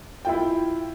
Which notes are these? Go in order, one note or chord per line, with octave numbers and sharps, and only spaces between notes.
E4 F4 G5